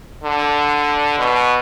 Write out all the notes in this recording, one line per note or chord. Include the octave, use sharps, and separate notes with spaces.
D3
B2